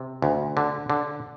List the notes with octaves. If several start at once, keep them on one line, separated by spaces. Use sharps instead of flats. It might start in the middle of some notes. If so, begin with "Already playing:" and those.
Already playing: C3
D2
D3
D3